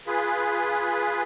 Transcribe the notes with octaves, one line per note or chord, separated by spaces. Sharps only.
F4 G#4 B4